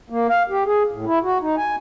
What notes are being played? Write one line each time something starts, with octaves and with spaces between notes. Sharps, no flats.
A#3
F5
G4
G#4
A2
E4
F#4
D#4
G#5